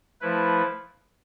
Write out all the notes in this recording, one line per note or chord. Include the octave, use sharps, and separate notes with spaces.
F3 A3 E4 B4